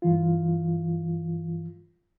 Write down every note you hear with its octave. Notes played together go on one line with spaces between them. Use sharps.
G2 E3 F4